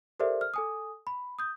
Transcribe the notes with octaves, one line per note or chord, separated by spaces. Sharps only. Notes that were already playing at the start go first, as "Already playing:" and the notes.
G4 A4 A#4 C5 D5 E5
F6
A4 G#5 D#6
B5
D#6 G6